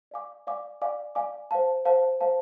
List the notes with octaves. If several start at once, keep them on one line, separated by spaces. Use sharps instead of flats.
D5 F5 G#5 D6
D5 F5 G#5 D6
D5 F5 G#5 D6
D5 F5 G#5 D6
C5 F5 A5
C5 F5 A5
C5 F5 A5